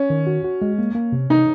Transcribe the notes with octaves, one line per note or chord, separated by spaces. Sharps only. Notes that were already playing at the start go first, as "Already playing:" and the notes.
Already playing: C#4
D#3
F#4
F#4
G#3
A#3
A#3
C3
C3 D#4